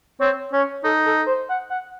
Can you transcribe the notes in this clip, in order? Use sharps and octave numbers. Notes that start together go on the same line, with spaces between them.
C4 C#5
C#4 C#5
D#4 A4
A4
C5
F#5
F#5